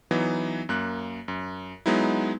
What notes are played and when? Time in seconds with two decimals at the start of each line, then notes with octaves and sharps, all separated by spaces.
0.11 E3 F#3 B3 D#4
0.69 F#2 A#3 F#6
1.28 F#2
1.86 F#3 G#3 B3 D#4 E4